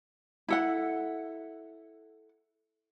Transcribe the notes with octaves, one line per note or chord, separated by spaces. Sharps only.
E4 A4 F#5